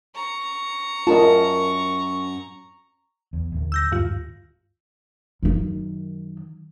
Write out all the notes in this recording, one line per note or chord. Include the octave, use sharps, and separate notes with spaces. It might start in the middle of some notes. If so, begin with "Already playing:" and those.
A#5 C#6
F#2 F4 A#4 D#5 A5
E2
D1 D#2
E6 G6 A#6
G2 F4
F#2 D#3